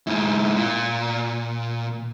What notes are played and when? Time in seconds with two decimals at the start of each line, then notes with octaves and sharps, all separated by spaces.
0.07 G#2 E4
0.56 A#2